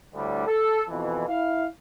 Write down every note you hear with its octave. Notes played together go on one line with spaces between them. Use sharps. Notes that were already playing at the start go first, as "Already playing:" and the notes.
D2 A2 D3 G3
A4
F2 B2 E3
E4 F5